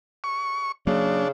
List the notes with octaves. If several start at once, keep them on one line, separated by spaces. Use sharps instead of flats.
C#6
C#3 F#3 A#3 D4